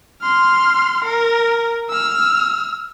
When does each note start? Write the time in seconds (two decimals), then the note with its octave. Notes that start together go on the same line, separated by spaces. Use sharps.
0.21 C6 F6
1.05 A#4
1.90 E6 F6